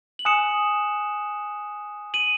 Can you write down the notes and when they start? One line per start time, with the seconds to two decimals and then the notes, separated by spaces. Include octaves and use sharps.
0.19 F#7
0.25 G#5 D#6 F#6 C#7 E7
2.14 D#7 F#7